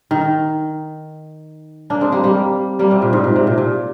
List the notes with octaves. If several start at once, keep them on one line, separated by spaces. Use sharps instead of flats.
D#3
A#3 D4
G#3 C4
G3 A#3
G3 A#3
G3 A#3
C3
A#2
G#2
A#2
C3
A#2
A#2